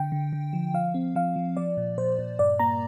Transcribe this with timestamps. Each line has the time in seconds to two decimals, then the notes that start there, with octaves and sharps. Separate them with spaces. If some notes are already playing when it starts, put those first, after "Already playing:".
Already playing: D3 G5
0.12 D3
0.33 D3
0.53 F3
0.74 F3 F5
0.94 C4
1.15 F3 F5
1.36 F3
1.57 F3 D5
1.77 A#2
1.98 A#2 C5
2.19 A#2
2.39 G2 D5
2.59 A#3 A#5